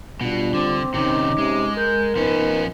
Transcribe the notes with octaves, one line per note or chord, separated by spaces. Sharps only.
B2 G3 D4 F4
D3 C4 D6
C3 D#3 C#4 D#4 D6
C3 G#3
A#4 G6
F3 B3 C#4 D#4 B4